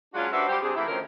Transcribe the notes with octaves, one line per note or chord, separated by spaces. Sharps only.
F#3 G#3 C#4 D4 F4 F#4
D4 F#4 G4 B4 C5 E5
G3 G4 C5
C3 C4 D4 G#4
E3 A3 A#3 E4
D2 D#3 F3 C4 C#4 A#4